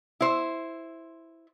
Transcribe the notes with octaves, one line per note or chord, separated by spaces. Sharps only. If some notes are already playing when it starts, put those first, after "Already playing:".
E4 C5